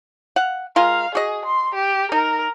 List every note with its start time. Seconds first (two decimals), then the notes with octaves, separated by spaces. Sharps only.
0.36 F5 F#5
0.76 G#3 F4 A#4 F5
1.15 F#4 G#4 D#5
1.46 C6
1.75 G4
2.12 D#4 A#4